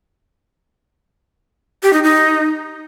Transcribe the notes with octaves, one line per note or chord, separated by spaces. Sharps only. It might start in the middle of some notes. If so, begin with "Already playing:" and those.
G4
D#4
D#4